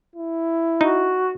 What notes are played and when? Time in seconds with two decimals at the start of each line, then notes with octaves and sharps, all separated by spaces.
0.16 E4
0.81 D#4 F#4